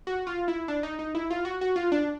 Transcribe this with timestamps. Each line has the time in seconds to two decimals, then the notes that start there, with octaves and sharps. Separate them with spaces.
0.07 F#4
0.27 F4
0.48 E4
0.68 D4
0.83 D#4
0.99 D#4
1.15 E4
1.30 F4
1.45 F#4
1.61 F#4
1.76 F4
1.92 D4